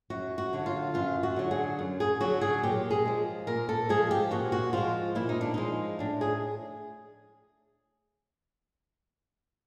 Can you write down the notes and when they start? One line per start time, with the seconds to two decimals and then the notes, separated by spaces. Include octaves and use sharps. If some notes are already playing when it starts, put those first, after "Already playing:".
0.10 F#2 F#4
0.38 F#4
0.53 D3 F#3
0.66 F4
0.94 F#2 F4
1.23 F#4
1.36 D3 F#3
1.51 G#4
1.79 F#2
2.00 G#4
2.20 D3 F#3 F#4
2.41 G#4
2.63 A#2 G4
2.90 G#4
3.05 F3 G#3
3.47 A#2 A#4
3.69 A4
3.89 F3 G#3 G#4
4.11 G4
4.31 A#2 F#4
4.52 F#4
4.73 F3 G#3 F4
5.15 A#2 E4
5.29 D#4
5.41 D4
5.54 F3 G#3 D#4
5.99 A2 D4
6.21 G#4